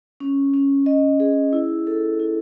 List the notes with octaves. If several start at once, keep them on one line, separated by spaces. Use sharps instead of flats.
C#4
C#4
D#5
G#4
E4
A4
E4